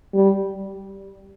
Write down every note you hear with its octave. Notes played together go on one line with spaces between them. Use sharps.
G3